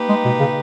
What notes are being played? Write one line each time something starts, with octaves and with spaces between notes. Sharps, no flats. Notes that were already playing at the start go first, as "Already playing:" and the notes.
Already playing: A#3 D#4 G4 B4
G#3
B2
C#3